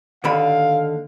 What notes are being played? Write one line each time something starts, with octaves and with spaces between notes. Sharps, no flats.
D#2 D3 F5 B5